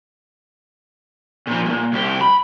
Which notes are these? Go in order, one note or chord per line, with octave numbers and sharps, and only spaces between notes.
A#2 F3
G2 A#2
C2 G4
B5